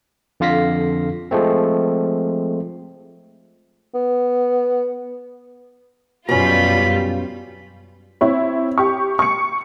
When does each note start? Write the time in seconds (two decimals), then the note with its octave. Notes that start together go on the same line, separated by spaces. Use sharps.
0.40 F2 D3 F4 F5 A#6 B6
1.31 F3 G#3 A3 C4
3.94 B3
6.29 F#2 B2 G3 C#4 F4 B5
8.21 C4 E4 C#5
8.78 G4 C#6
9.19 C#6 C#7